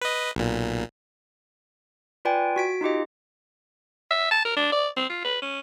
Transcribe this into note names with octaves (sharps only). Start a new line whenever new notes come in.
B4 D#5
B1 A#2
F4 B4 D5 G5 G#5
F#4 B6 D7
D#4 F4 G4 D#5
E5
A5
A#4
D4
D5
C4
F4
B4
C#4